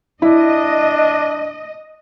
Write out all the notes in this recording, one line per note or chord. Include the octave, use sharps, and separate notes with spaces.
D4 E4 D#5